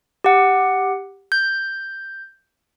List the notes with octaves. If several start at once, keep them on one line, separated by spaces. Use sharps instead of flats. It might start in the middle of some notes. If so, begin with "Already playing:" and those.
G4 F#5
G6